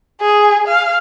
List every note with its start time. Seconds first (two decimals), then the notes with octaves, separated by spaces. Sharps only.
0.21 G#4
0.68 F5